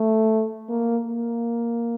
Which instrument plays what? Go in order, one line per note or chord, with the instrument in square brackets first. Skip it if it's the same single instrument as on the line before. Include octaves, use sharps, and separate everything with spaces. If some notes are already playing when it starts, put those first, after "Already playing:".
Already playing: [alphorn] A3
A#3
A#3